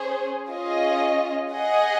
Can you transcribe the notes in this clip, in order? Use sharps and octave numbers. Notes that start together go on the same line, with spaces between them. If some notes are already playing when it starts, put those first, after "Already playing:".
Already playing: C#4 G#4 C5
C#4 F4 G#4 D#5
G#4 D#5 F#5